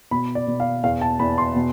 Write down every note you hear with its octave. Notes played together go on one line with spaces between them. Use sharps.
B2 B5
D5
B2
F5
E2 F5
A5
E2 B5
C6
B2